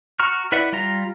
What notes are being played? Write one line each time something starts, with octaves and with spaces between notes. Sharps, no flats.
F#4 A#5 C#6 F6
E4 B4 D5 E5 F#5
G3 F4 A#5